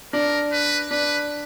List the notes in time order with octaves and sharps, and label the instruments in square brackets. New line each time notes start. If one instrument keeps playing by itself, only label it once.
[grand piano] D4 [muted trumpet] A#4
[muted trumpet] B4
[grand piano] D4 [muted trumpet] B4